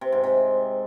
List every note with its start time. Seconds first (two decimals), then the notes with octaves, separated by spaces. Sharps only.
0.01 C3
0.12 G#2
0.24 C3